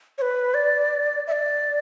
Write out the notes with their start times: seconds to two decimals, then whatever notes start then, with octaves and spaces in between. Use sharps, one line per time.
0.18 C#5
0.22 B4
0.54 D5
1.27 E5
1.32 D5